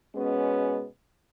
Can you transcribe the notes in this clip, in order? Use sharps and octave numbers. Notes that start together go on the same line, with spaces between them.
B2 G#3 B3 C#4